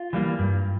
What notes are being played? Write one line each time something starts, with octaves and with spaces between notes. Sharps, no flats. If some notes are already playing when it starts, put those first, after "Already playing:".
Already playing: F4
E3 G3 A#3
G2